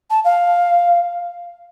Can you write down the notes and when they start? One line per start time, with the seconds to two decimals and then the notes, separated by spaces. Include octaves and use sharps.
0.10 A5
0.24 F5